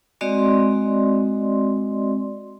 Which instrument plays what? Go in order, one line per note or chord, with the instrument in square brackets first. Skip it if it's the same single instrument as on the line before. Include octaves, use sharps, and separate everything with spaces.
[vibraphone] G#3 C4 F#4 D5 D#5 C6